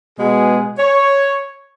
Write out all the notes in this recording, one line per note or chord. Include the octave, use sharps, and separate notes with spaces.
B2 G#3 B3 G#4
C#5